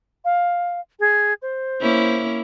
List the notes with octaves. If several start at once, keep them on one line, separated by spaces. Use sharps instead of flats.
F5
G#4
C5
A#3 C#4 E4